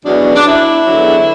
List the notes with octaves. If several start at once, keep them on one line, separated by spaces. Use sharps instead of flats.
E2 B2 F#3 D4
D4
E4
E2 D3 F#3